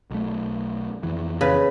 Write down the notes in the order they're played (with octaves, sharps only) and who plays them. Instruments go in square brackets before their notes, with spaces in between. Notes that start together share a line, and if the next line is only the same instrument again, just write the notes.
[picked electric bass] B1 A3
F2 E3
[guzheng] C#3 B4